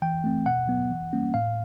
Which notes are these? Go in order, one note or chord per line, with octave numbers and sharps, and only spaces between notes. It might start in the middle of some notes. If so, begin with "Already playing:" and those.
E3 G5
A3 C4
B2 F#5
F#3 B3
E3
G3 A#3 C#4
A2 F5